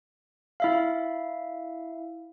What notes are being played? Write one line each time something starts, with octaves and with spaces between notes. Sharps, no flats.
E4 E5 F5